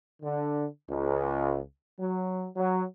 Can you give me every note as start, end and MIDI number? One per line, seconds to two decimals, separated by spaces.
0.22 0.65 50
0.89 1.58 37
2.00 2.45 54
2.57 2.83 54